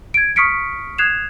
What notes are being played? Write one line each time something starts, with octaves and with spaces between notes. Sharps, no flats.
G#6 D7
C#6 D#6 F6 B6 C#7 D7
D#6 F#6 G#6 C7 E7 F7